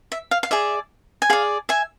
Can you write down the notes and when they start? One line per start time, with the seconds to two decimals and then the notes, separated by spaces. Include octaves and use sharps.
0.12 E5
0.31 F5
0.43 F5
0.51 G#4 D5 E5
1.22 G#5
1.30 G#4 D5 F5
1.69 E5 G#5